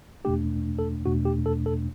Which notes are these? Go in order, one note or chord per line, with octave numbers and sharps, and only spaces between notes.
E2 B2 A3 D4 G4
A4
E2 B2 A3 D4 F#4
G4
A4
A4